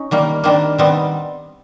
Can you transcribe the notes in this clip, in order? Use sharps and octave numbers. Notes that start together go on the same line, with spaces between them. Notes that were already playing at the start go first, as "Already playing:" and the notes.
Already playing: C#4 D#4
D#3 G3 A#3
D#3 G3 A#3 C4 D4
D#3 G3 B3 C4